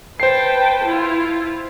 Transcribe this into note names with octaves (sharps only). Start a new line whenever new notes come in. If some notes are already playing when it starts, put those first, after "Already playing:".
B4 C5 G5 A5 C7
E4 F4